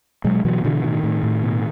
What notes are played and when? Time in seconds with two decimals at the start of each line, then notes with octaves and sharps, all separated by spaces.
0.24 B2 F#3 G#3
0.45 B2 E3 F#3
0.64 B2 D3 E3
0.84 A2 D#3
1.03 A2
1.23 A2
1.43 B2